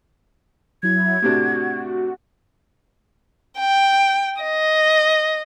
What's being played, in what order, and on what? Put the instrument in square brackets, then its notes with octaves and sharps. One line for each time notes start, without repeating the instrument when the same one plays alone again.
[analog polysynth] F#3 E4 [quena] G#6
[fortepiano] A2 C3 D4 [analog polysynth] F#4
[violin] G5
D#5